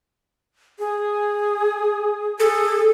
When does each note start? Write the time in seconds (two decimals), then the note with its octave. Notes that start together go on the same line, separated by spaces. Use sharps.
0.79 G#4
2.40 G#4 A4